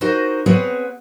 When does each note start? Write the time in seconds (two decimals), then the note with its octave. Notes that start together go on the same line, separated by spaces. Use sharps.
0.01 D#4 F#4 A#4 C5 D#5
0.46 B3 C4 G#4 B4 C#5 F#5